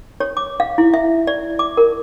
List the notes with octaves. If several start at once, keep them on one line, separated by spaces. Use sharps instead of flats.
C#5
D6
F5
E4
E5
D5
D6
A#4